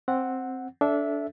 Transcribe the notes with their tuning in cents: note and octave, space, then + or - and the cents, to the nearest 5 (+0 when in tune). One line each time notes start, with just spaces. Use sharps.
C4 +5 F#5 +0
D4 -20 A4 -15 E5 +0